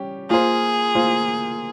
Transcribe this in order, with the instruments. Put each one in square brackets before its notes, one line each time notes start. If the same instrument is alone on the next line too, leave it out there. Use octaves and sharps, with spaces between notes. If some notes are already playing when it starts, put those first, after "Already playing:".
Already playing: [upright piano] G3 C#4 G4
[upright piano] A#3 F4 C5 [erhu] G#4
[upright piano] A#3 F4 C5